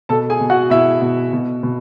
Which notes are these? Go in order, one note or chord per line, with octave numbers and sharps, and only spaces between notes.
B2 A4 A5
G#4 G#5
B2
F#4 F#5
B2 E4 E5
B2
B2
B2